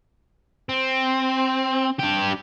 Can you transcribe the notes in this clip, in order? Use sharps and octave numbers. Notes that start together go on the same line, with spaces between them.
C4
D4 G4